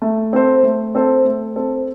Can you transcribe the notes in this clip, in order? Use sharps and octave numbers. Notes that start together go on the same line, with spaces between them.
A3
C4 A4 C5
A3
C4 A4 C5
A3
C4 A4 C5